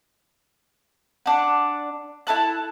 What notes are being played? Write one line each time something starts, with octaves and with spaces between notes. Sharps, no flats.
D4 F#5
E4 A4 A5 F#6